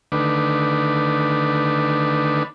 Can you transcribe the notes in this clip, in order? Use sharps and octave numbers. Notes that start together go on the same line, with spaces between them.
D3 D#3 A3 D4 B4